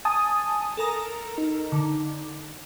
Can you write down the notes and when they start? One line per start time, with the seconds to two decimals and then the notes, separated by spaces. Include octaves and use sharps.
0.05 G#5 A5 D#6
0.77 A4 A#4 A#5
1.38 D#4
1.72 D3